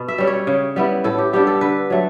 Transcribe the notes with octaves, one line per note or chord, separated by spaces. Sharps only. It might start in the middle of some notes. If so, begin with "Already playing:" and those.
Already playing: B2
E5
G3 C#4
C#5
C#3
G3 B3 E4
A2 A4
G4
G3 B3 D4 G4
A4
D3 B4
F#3 A3